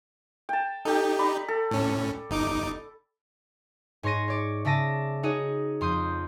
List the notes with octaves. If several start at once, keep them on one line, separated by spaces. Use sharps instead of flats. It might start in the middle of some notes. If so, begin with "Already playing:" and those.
G5 A5
D#4 G4 A4 G5
D5 A#5 B5
A4
A2 C#4
G1 D#4 D6
G#2 C#5 C6 C#6 A#6 D#7
C#5 D5 C#6
C#3 D5 E5 A5 A#6 D#7
D#4 F#4 G#4 C#5 D#5
F2 C6 D#6 G6